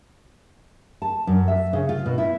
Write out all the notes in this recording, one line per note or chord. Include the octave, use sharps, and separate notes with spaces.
A5
F#2
E5
C#3
F4
B2
E4